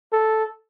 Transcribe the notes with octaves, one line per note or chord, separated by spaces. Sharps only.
A4